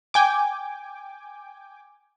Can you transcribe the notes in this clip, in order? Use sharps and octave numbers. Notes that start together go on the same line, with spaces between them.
G5 G#5 D6